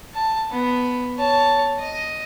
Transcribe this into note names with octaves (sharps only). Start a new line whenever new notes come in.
A5
B3
C#5 A5
D#5